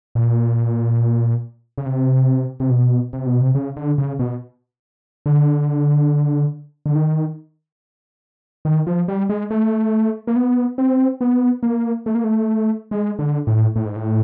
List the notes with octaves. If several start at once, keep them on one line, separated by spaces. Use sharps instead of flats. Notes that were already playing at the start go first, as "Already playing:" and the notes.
A#2
C#3
C3
C3
B2
C3
B2
C3
C#3
D3
C#3
B2
D3
D3
D#3
D#3
F3
G3
G#3
A3
A#3
B3
C4
B3
A#3
A3
A#3
A3
G#3
D3
A2
A2
G#2
A2